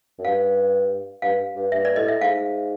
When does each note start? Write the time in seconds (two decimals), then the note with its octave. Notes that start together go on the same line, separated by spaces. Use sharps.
0.18 F#2
0.25 G2 F5
1.22 G2 F5
1.56 G2
1.72 G2 E5
1.85 D5
1.96 A2 D#5
2.08 E5
2.21 G#2 F5